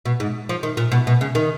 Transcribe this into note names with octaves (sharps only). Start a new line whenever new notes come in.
B2
G#2
F3
D#3
A#2
B2
B2
C#3
D#3